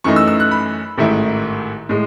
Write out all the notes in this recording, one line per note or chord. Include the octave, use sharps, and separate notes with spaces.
F#2 E3 A3 D#4 C#6
E6
E6
F#6
B5
A1 G#2 D#3 A3 E4
A2 G#3